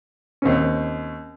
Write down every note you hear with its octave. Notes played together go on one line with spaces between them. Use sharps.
D#2 C4 C#4